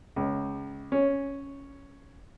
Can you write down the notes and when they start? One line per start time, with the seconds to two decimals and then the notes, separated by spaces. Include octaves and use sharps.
0.16 C#2
0.92 C#4